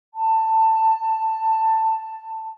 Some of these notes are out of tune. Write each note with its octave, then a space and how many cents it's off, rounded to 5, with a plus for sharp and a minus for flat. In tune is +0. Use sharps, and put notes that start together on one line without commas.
A5 +15